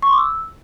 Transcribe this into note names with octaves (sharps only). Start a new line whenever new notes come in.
C#6
C6
D6
E6